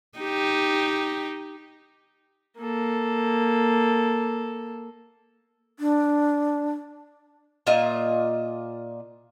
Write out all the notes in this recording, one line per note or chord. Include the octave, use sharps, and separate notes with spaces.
D#4 G4
A#3 A4
D4
A#2 F4 D#5 E5